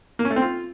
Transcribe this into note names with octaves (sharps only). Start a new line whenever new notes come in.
A#3
C#4
A3
C4
F4